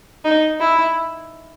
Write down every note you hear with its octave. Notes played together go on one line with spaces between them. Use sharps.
D#4
E4